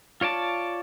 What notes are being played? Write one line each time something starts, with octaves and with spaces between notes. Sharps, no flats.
F4 C#5 D5 A5